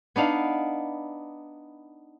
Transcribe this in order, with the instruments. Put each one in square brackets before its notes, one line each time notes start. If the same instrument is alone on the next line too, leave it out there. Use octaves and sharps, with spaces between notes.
[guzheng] B3 D4 D#4 F5